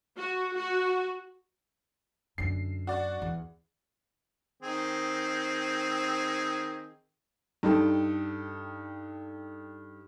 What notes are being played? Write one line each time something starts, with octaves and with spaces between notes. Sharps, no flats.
F#4
F#4
F#2 D3 C7
F#4 D5
E2
D#3 C4 G#4
G2 D#4 G4 A4